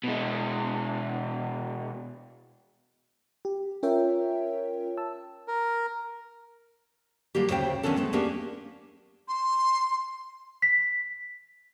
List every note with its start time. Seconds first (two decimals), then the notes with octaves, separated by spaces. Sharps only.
0.04 B2 G#3
3.45 G4
3.83 C#4 F4 A#4 C#5 E5 G5
4.97 A5 E6
5.48 A#4
7.35 D3 G3 A#3 G4
7.49 D2 A2 C#3 C5 F5 G5
7.83 D#3 B3 C#4 D4 A4
7.96 G#3 A3 B3
8.13 A#3 B3 C#4 D4 G4 A#4
9.28 C6
10.62 B6